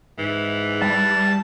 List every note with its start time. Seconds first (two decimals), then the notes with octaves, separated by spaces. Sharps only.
0.18 G#2 E3
0.82 G3 A5